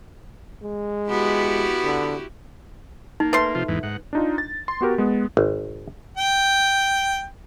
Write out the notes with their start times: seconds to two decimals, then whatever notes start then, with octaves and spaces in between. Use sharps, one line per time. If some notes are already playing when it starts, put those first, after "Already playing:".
0.62 G#3
1.09 B3 E4 F#4 G4
1.83 D3
3.20 A#3 D#4
3.33 A3 B4 C6
3.55 C3 F3 F4
3.68 E2 G#2 E3
3.83 G#2 F#5
4.13 D4 D#4 F4
4.38 A6
4.68 C6
4.81 B3 F#4 G4 A#4
4.98 G#3 B3
5.37 G#1
6.17 G5